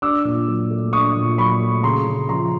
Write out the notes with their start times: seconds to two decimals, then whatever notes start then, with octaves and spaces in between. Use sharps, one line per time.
0.02 D4 D6 E6
0.25 A#2
0.48 F#3
0.70 A3
0.93 D4 C#6 D#6
1.16 A#2
1.38 F#3 B5 C#6
1.61 A3
1.83 C#3 A#5 C6
2.06 C#3
2.29 F3 A#5 C6